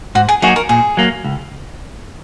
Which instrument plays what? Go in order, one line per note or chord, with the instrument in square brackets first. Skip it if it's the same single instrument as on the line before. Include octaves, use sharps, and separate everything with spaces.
[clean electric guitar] G#2 [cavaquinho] F#4
[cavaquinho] G#4
[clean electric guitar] F#3 A#3 D#4 F#4 [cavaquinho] G#4
[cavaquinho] A#4
[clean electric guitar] A#2 [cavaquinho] G#4
[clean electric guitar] F#3 A#3
C#2